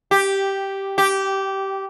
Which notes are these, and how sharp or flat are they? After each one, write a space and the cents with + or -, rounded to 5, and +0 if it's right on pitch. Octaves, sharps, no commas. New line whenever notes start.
G4 -5
G4 -15